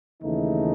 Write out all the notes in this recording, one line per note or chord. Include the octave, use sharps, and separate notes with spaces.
D#2 C#3 E3 A3 D#4